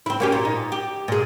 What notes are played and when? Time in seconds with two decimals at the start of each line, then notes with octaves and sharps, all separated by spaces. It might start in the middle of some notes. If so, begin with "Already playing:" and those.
0.06 C4 E4
0.20 A#3 C#4 G4
0.32 A#2
0.45 D#4
0.72 G4
1.08 A#2 G#4